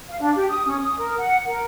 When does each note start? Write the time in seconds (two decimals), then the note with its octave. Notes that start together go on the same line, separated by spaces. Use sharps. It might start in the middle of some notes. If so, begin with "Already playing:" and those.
0.08 F5
0.21 D4
0.35 G4
0.50 D#6
0.66 C#4
0.80 D#6
0.98 A#4
1.19 F#5
1.46 A#4